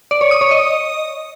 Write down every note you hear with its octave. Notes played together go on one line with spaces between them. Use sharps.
D5
C#5
D#6
C#5
D#5